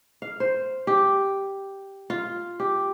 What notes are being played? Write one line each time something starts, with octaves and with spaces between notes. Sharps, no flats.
F5
C5
G4
F4
G4